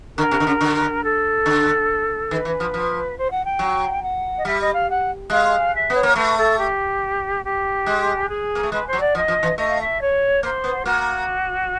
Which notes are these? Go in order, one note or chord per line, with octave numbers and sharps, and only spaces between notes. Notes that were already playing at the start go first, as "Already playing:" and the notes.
D3 A#4
C3
D3
C#3
D3
A4
D3
D#3 B4
E3
F3
F3
C5
F#5
G5
F#3
F#5
D#5
G3 E5
D#5
F5
F#5
G#3 F5
E5
B3 C#5
A#3
A3 B4
A4
G4
G4
G#3
G#4
A#3
A3
G#3 B4
C5
F#3
D5
F3 D#5
F3
E3
A3 D#5
F5
E5
C#5
A#3 C5
B3
A#3 F#4